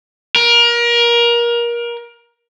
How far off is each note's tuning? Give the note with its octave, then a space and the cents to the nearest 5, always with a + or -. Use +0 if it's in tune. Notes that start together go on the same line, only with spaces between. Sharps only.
A#4 +25